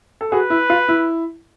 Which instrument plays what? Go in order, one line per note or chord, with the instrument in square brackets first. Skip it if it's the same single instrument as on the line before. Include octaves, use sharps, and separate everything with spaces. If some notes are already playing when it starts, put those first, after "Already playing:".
[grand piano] A4
[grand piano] F#4 G#4 [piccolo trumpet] B4
[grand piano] E4
F4
E4